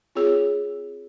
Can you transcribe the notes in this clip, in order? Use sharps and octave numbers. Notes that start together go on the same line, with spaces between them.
C4 F4 G#4 C#5